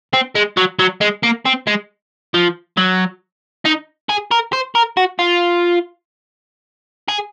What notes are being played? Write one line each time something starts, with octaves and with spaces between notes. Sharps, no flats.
C4
G#3
F#3
F#3
G#3
A#3
C4
G#3
F3
F#3
D#4
G#4
A#4
C5
A#4
F#4
F4
G#4